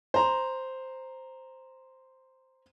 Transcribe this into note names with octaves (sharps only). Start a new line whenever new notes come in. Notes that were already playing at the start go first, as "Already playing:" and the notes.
C5 A#5